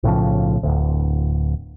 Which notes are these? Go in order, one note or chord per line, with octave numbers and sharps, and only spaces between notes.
B1 A2 C#3 F3
D1 G#1 D2